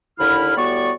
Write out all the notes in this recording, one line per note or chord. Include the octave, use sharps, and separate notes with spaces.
D#2 D3 E4 B5 F6
A2 G3 B3 F#4 D5 C#6